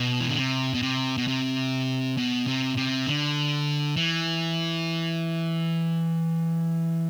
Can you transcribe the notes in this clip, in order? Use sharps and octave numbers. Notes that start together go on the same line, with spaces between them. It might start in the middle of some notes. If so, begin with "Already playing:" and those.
Already playing: B2
E3
D3
C3
B2
C3
B2
C3
B2
C3
C3
D3
E3